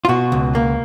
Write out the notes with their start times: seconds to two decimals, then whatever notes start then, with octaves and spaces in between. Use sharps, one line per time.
0.05 F4
0.09 B2 F#4
0.32 C#2
0.55 A#3